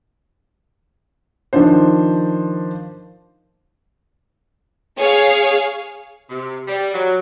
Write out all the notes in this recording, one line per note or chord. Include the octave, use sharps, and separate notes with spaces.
D#3 F3 D4 C5
G#4 C#5 F5
C3
G3
F#3